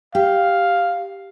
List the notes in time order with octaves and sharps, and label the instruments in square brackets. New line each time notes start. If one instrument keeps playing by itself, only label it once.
[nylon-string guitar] G4 [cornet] F5